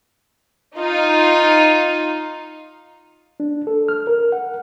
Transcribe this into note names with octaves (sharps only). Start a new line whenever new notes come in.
D#4 F4
D4
A4
F6
A#4
F#5